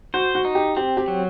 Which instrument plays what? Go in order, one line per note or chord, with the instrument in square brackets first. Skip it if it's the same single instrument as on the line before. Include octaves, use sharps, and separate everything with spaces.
[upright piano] F#4 [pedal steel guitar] C5
[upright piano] F#4
[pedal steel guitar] D#4
[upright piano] G4
[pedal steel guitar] C4 [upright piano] G4
[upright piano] G4
[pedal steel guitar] F#3